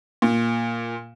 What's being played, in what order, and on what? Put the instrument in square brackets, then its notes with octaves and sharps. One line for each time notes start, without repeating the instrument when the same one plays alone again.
[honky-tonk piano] A#2